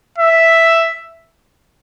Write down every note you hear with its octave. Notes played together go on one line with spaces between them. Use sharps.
E5